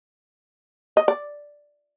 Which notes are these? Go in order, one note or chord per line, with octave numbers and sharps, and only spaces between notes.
D#5
D5